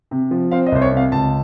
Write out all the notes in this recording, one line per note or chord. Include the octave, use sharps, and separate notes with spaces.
C3
F3
C4 F5
D#5
C2 C5
C#5
C3 F5
C#2 A5